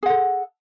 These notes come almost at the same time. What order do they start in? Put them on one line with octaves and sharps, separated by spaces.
G#4 F#5 A4